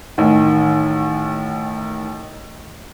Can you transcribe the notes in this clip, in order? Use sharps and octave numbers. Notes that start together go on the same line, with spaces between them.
A1 D#3